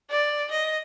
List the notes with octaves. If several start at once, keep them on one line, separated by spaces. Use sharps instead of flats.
D5
D#5